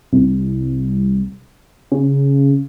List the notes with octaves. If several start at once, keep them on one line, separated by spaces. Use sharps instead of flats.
C2
C#3